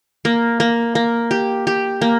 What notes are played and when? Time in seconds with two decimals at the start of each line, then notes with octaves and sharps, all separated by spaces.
0.25 A#3
0.60 A#3
0.95 A#3
1.31 G4
1.67 G4
2.01 A#3